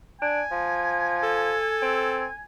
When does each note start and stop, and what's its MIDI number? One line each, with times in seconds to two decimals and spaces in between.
0.22 0.43 62
0.22 2.46 80
0.51 1.59 53
1.23 2.31 69
1.82 2.26 60